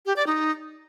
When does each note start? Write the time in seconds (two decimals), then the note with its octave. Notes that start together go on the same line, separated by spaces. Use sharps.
0.06 G4
0.16 D5
0.27 D#4